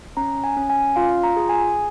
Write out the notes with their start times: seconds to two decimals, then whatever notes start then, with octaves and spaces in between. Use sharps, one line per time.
0.17 C#4 A#5
0.44 G#5
0.57 C#4
0.70 G#5
0.96 F4 F5
1.23 A#5
1.37 G#4
1.49 G#5